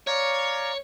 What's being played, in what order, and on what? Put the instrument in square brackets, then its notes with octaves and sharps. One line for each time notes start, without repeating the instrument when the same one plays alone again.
[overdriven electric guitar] C#5 [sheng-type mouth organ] D5 F5 A#5